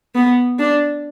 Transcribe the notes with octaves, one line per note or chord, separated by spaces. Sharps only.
B3
D4